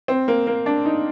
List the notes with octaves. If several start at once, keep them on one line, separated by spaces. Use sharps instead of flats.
C4
A#3
A#3
D4
D#4